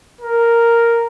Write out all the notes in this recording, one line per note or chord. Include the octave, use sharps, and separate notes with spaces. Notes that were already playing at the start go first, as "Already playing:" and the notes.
A#4